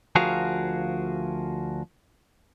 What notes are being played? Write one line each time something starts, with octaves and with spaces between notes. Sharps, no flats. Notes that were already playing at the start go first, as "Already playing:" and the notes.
D2 F3 F#4 G#4 A#4 F5